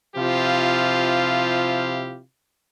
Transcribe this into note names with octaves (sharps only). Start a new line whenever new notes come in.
C3 F3 E4 F4 G4 F5